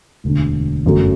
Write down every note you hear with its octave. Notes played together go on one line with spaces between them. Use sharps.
E1 D2 D3
G1 F#2 F#3 A3